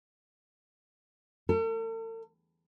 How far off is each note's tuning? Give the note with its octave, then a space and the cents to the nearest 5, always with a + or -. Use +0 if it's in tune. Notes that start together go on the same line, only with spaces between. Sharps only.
A4 +45